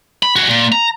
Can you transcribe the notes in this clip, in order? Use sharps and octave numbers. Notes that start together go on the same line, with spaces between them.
B5
F#4 G#4
A#2
A#5